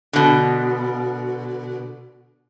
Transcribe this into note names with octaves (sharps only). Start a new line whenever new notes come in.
B2 D3